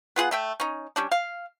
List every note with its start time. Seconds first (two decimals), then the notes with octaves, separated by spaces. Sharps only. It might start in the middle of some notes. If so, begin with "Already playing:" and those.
0.16 B3 F4 G#4 F#5
0.31 A3 E5 G5
0.60 C#4 D#4
0.96 G3 C#4 D4
1.12 F5